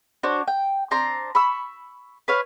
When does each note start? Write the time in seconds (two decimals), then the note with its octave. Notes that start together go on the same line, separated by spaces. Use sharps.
0.23 D4 F#4 C5 C#5
0.48 G5
0.91 C4 D4 A#5 C6
1.35 B5 C#6 E6
2.28 B4 C#5 F5